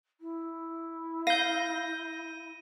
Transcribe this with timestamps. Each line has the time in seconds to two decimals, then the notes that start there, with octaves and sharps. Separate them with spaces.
0.20 E4
1.27 F5 G6 A#6 D#7